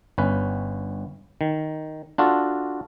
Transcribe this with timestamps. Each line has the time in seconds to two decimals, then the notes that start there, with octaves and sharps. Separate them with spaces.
0.18 G1 C#4 B4
1.41 D#3
2.18 D4 F4 F#4 A4